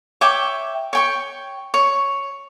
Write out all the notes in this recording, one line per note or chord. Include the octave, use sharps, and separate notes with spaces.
C#5 E5 G5 D6
C#5 G5 C#6
C#5